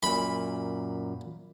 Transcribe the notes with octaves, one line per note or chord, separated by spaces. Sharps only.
F#2 A#2 B5